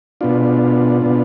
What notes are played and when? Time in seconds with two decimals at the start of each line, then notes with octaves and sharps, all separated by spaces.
0.21 B2 B3 D4 F4
1.01 B2 B3 D4